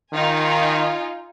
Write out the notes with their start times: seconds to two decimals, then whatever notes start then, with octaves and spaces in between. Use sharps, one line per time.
0.13 D#3 D#4 F4 G#5